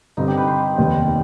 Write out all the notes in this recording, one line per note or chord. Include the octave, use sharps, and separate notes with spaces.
G2 D3 G3 C4 D#4
G4
B4
C5
F1 D#2 D#3 B3